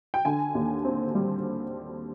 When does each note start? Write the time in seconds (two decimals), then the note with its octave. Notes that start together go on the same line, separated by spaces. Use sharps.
0.14 G5
0.25 D3 G#5
0.55 D#2
0.85 C4
1.15 G3